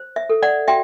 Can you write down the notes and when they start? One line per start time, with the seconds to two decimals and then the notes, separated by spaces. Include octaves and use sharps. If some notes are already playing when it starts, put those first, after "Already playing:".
Already playing: C5
0.16 E5
0.30 A4
0.42 D5 F#5
0.68 F#4 E5 G5